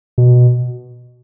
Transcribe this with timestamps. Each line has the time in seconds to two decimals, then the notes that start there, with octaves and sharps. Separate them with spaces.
0.18 B2